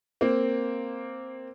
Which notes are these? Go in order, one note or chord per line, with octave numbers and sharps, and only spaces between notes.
A#3 C4